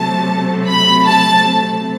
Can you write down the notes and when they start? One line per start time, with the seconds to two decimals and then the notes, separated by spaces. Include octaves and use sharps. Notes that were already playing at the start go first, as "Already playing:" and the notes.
Already playing: C3 F#3 A3 A5
0.67 B5
1.05 A5